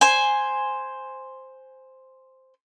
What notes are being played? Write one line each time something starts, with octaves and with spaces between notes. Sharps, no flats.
C5 G#5